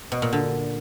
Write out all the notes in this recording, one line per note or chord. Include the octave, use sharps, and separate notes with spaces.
B2
A#2
D3